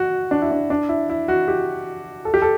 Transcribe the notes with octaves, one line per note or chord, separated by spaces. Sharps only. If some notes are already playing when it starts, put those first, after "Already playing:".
Already playing: F#4
D4
E4
D4
D4
E4
E4
F#4
G4
A4
G4
A4